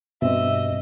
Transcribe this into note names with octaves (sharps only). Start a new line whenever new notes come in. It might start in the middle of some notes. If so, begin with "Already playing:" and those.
G2 B2 C4 D#5 E5